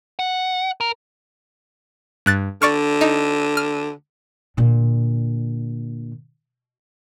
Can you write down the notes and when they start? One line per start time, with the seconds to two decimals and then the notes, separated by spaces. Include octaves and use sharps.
0.19 F#5
0.81 A#4
2.26 G2 F#6 A6
2.62 D3 D5 C#6 F6
3.01 D#4
3.57 F6
4.57 A#2 D3